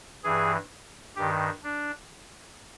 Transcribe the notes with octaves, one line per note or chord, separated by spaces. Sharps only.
G2 E3 G#4
G2 D#3 G4
D4